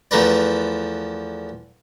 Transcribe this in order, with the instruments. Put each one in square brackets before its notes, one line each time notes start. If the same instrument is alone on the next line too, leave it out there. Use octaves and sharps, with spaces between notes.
[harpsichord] E2 F3 A3 A#4 B4 D5